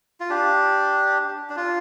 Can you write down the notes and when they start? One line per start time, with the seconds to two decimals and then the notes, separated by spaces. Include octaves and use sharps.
0.20 F4
0.30 D4 G4
1.50 D4
1.57 F4